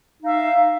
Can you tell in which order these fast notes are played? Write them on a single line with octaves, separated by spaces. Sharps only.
D#4 F5 E5